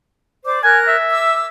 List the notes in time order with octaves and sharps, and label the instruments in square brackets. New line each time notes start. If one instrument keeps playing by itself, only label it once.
[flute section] C5 D5 D6
[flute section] A#4 F#6 [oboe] G#5
[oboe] E5
[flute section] D6 E6